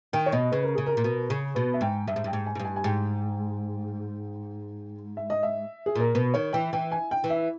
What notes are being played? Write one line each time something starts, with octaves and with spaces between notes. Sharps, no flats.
D#3 G5
C#5
B2 D#5
C#3 B4
A#4
C#3 G#4
A#4
A#2
B2
C#3 G#4
B2 B4
E5
G#2 G5
G2 E5
G#2
G2 G5
G#2
G#5
G#2
G2
G#5
G#5
G#2 G5
E5
D#5
E5
G#4
A#2 A#4
B2 B4
D#3 C#5
E3 G5
E3 G5
G#5
G5
E3
E5